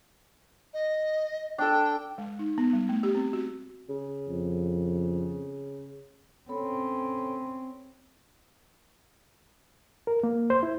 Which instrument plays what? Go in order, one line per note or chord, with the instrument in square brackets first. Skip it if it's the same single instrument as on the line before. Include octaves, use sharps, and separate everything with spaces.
[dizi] D#5
[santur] D4 A4 [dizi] G5
[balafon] G#3
D#4
B3
G3
A3
G4
C4
F#4
[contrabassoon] C#3
[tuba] F2
[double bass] C4 C#4 [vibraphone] A4 C#5 B5
[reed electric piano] A#4
A#3
C5
E4